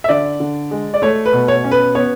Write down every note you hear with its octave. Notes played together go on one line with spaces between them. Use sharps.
E5
D3 D5
D3
G#3
D5
A3 C#5
B4
B2
C#5
C#4
B4
B3 C#5